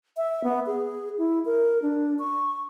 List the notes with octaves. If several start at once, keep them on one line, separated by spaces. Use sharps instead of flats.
E5
B3
G#4
E4
A#4
D4
C#6